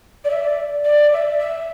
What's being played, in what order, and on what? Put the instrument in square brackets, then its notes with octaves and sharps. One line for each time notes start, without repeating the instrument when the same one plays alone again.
[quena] D5
E5
D5
D5
E5
E5